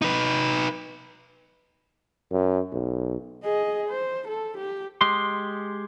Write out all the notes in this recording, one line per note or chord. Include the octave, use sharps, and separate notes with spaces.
D#4 B4
F#2
B1
G#4 D#5
C5
A4
G4
G#3 G4 C6